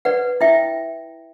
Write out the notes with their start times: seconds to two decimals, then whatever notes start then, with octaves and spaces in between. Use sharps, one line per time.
0.05 B4 D5 F#5
0.41 E4 E5 G5